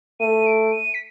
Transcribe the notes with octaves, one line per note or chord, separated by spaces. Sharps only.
A3 D#7
D7
D#7
B6